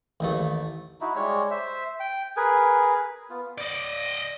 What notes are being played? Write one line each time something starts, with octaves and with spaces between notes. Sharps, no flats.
A1 D#2 A3
D#4 E4 F#4
G3 G#3 C#5
C5 E5
G5
G#4 A#4 B4 G#5
B3 F4
D5 D#5